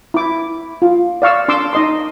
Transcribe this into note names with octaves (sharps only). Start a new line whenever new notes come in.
E4 D6
F4
D5 F5 C#6 E6
D4 C6 D6 E6
D#4 D#5 C6